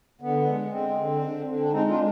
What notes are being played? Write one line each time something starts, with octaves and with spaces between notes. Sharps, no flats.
D3 B3
G#3
G#3 C4
D3
D3
D3
D4
G#3 C4 D#4
D4 F4
G#3